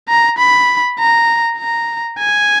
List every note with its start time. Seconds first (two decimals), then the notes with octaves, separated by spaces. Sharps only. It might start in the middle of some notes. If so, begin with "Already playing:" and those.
0.09 A#5
0.38 B5
0.99 A#5
1.58 A#5
2.19 G#5